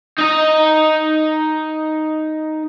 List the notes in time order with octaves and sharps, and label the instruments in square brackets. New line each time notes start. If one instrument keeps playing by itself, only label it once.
[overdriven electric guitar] D#4 D#5